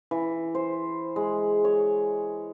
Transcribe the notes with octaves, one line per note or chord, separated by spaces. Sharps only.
E3
C5
G#3
C#5